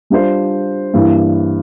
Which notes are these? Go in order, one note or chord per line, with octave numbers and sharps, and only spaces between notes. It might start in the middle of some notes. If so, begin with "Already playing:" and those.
G3 D4 F4 C5
G2 E3 A#3 E4